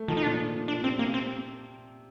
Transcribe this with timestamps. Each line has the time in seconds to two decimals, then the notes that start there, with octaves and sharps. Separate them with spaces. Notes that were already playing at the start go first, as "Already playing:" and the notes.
Already playing: A3
0.08 D#3 F3
0.17 D#4
0.23 A#2 D4
0.38 A#2
0.68 D4
0.73 A#2
0.83 C3 C4
0.99 A#3
1.07 C3
1.14 C4